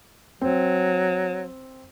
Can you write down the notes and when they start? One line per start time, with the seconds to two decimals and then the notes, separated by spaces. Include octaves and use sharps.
0.41 F#3 C4